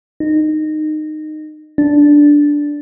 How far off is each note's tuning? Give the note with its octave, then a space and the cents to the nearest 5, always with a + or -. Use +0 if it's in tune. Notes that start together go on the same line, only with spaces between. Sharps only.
D#4 -20
D4 -5